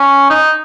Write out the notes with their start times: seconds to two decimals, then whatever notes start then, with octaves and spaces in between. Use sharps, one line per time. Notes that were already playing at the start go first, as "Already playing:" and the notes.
Already playing: C#4
0.30 D#4